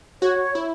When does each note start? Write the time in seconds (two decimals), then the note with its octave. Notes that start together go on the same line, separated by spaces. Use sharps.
0.22 F#4 C#5
0.55 E4